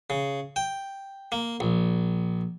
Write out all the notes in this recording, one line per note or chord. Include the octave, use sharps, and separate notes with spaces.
C#3
G5
A#3
A#1